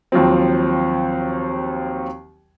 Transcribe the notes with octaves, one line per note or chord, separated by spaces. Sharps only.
D#2 F3 F#3 C4